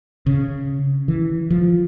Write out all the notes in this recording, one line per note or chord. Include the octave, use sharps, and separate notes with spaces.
C#3
E3
F3